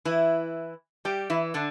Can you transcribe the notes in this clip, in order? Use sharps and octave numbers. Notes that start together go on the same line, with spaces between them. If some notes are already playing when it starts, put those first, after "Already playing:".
E3 E4
G3 G4
E3 E4
D3 D4